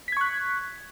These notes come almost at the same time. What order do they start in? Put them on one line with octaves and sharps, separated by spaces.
B6 G#6 C#6 F#6